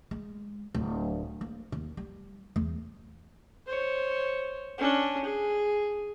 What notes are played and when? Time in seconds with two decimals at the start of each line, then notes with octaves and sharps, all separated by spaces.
0.11 G#3
0.74 D1
1.41 A#3
1.72 D#2
1.97 G3
2.56 E2
3.66 C5 C#5
4.78 C#4 D4
5.24 G#4